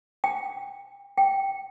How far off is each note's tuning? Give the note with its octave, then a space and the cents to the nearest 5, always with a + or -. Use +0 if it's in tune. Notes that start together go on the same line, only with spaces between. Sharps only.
G5 +35
G5 +0